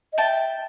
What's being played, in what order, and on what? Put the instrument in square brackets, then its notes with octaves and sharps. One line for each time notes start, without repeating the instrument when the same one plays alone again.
[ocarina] D#5
[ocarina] E5 [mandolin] G5 A5